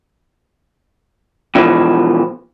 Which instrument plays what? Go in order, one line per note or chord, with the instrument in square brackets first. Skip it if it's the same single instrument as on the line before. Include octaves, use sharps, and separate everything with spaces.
[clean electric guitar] B2 E3 F3